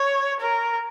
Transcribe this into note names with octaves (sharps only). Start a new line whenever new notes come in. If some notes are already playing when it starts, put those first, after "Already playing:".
Already playing: C#5
A#4